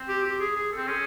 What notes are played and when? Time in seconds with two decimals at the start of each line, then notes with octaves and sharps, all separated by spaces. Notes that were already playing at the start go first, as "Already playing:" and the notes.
Already playing: C4
0.09 G4
0.25 G4
0.40 G#4
0.56 G#4
0.72 A4
0.77 C4
0.88 C#4 G#4